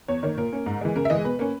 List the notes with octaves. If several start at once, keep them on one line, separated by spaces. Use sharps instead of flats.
E2 C#5
D#3 A#3 C#5
A#2 A#4
A#3 C#4
G#2
E3 G#3
C#3 A#4
E5
E3 G#3 D#5
B2 B4
A#3 C#4